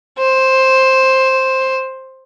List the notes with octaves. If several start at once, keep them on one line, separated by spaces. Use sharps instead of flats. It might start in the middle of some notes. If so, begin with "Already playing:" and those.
C5